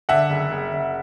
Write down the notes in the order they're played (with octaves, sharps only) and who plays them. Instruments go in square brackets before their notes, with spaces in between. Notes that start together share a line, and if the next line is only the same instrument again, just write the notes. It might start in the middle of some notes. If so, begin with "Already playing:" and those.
[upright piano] D3 E5 F#5
F#1
F#1
F#1